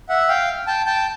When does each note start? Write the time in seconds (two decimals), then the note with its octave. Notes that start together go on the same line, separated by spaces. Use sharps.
0.09 E5 F#5
0.29 F5 G5
0.67 G5 A5
0.86 G5 A5